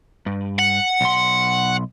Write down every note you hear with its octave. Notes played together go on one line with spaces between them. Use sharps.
G2
F#5
B1 C6